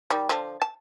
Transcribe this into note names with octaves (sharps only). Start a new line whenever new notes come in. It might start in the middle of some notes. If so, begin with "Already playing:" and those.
D#3 G3
D3 F3
A5